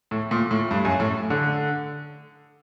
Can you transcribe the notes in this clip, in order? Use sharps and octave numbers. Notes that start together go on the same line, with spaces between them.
A2
A#2
A2
G2
F#2
A2
D3